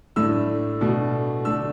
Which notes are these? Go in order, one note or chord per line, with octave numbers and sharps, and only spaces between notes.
A2 A3 D4 E6
B2 A3 D4
D3 A3 D4 E6